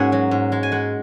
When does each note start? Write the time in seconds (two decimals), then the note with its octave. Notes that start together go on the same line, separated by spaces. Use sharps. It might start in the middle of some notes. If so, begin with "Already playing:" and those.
Already playing: G#2 A#3 C#4 F#4 G#4 F#5 G#5
0.12 F#3
0.31 G#2
0.52 G#3
0.63 G#5
0.72 G#3 F#5